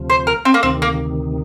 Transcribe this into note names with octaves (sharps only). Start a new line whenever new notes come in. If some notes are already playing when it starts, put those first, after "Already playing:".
Already playing: D2 C3 F3
C5
A#4
C4
A#3
D2 C3 D#3 C4
A#3